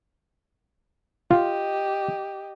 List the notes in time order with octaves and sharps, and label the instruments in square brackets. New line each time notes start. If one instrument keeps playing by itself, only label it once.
[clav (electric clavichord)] F4 [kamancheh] G4 D#5